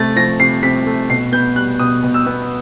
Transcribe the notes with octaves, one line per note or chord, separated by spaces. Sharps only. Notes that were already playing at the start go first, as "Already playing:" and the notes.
Already playing: C3 A3 A6
F3 A#6
C3 C7
C3 B6
A3
B2 C7
B3 G6
G3 F#6
B2 D#6
B2
E6
B3